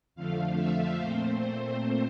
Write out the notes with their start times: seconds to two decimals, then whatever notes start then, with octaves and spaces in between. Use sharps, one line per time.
0.15 F2 D3 F3 A3 F5
0.57 E5
0.98 A#2 A3 C4 C5
1.40 C5